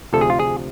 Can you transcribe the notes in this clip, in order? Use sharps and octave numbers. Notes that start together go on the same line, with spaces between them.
D2 C3 F3 A3 A4
G#4
F4
G#4